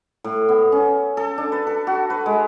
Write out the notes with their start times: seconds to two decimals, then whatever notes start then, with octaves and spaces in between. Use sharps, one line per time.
0.24 A2
0.49 B3
0.72 C#4
1.17 A4
1.38 D4
1.52 B4
1.67 A4
1.87 F#4
2.10 B4
2.26 G#3